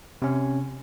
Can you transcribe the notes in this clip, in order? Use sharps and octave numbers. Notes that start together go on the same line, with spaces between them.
C3 C#4